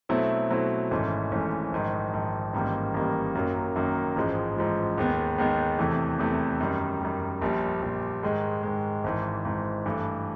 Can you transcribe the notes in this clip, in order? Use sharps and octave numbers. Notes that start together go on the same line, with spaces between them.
B2 F#3 A3 C4 E4
B2 F#3 A3 C4 E4
G#1 G#2 E3 A3 C#4
G#1 G#2 E3 A3 C#4
A#1 G#2 D#3
A#1 G#2 D#3
A1 G#2 D#3 G3 A#3
A1 G#2 D#3 G3 A#3
F#2 D#3 F#3 A#3
F#2 D#3 F#3 A#3
A1 G#2 F3 G#3
A1 G#2 F3 G#3
D#2 D#3 G#3 B3
D#2 D#3 G#3 B3
E2 C3 E3 A3
E2 C3 E3 A3
F#2 D#3 G3
F#2 D#3 G3
A#1 A#2 G3
A#1 A#2 G3
G#2 D#3 G#3
G#2 D#3 G#3
G#1 G#2 E3
G#1 G#2 E3
G2 E3 A3